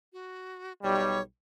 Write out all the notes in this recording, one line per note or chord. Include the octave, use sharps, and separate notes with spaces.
F#4
B1 G3 C#5